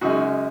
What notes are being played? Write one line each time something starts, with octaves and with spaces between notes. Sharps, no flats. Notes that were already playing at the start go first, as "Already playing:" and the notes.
F#2 C#3 G#3 D#4 F#4